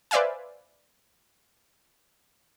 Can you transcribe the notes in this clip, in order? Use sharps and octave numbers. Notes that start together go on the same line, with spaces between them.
B4 C5 D5 E5 F5 G#5